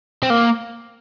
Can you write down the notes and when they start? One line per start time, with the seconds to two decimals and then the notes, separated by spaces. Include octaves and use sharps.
0.23 C4
0.30 A#3